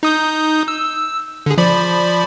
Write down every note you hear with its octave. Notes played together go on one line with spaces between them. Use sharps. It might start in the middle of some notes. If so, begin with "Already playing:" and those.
D#4 D#6 G6
E6
D3 G#4
F3 D5 B5